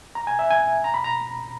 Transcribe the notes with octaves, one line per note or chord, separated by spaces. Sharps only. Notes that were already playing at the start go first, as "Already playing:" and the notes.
A#5
G#5
E5
G#5
A#5
B5
A#5